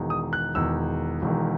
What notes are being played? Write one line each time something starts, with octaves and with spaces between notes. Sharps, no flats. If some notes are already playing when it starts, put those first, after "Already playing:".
Already playing: E1 E2 D#3
D#6
F#6
E1 E2 D#3 E6
E1 E2 D#3